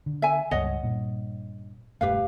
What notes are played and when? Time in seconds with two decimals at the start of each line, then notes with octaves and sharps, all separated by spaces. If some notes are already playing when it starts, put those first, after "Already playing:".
0.06 D3
0.22 E5 G#5
0.51 C#2 G2 C#5 D#5 F#5
0.83 G2 A#2
2.01 E1 G2 A3 G4 B4 F5